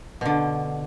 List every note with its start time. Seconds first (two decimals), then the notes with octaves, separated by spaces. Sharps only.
0.21 B2 D3